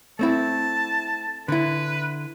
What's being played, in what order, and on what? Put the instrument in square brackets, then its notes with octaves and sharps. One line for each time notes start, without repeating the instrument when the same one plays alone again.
[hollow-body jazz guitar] A3 C4 E4 [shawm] A5
[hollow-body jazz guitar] D3 E4 [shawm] B4